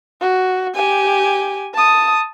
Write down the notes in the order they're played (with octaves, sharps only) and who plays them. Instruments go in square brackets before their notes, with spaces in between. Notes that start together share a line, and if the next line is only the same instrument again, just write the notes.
[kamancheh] F#4
G4 G#5
A5 D#6